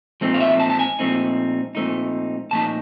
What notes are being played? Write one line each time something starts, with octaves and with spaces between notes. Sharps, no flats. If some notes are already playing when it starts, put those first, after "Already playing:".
A#2 F3 A3 C4 D#4
F5
E5
A5
A5
G#5
A#2 F3 A3 C4 D#4
A#2 F3 A3 C4 D#4
A#2 F3 A3 D#4 A5